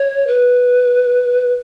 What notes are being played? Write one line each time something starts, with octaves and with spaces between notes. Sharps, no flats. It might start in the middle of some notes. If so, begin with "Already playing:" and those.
Already playing: C#5
B4